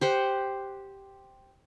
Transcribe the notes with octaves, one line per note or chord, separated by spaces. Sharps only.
G4 C5 F#5